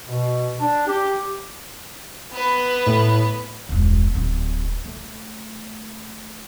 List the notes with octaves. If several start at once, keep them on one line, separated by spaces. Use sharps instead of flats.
B2
D4
G4
B3 B4
A2
E1 C#2
D1
A3